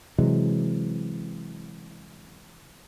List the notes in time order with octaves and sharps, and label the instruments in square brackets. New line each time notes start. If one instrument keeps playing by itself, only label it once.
[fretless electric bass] C3 E3 F#3 G#3